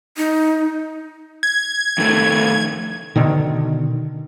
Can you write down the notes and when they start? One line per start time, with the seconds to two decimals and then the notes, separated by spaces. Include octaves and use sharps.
0.17 D#4
1.43 G#6
1.98 F2 D#3 A3
3.16 B2 D3 D#3